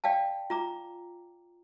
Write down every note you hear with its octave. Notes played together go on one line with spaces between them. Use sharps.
D5 F5 G5 A5
F4 A#5 D6